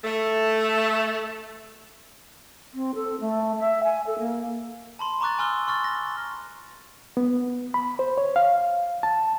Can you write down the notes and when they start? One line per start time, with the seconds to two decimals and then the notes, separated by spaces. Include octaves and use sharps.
0.04 A3
2.73 C4
2.94 A4
3.20 A3
3.58 E5
3.83 G#5
4.06 A4
4.18 A#3
4.99 A5 B5 C6
5.21 A#5 C#6 D6 F#6 A6
5.39 G#5 C6 E6 F6 G7
5.67 C6 C#6 F6 A6
5.84 F6 A#6
7.17 B3
7.74 B5
7.99 C5
8.18 C#5
8.36 F5
9.03 A5